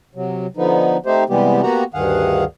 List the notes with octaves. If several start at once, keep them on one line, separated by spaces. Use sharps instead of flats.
C3 F#3
D3 F3 B3 D#4
A3 C4 D#4 G4 C5
C3 E3 G3 G#3 B3 G4
A#3 B3 F#4 G4 F#5 A#5
D2 G2 D#3 G#4 F5 F#5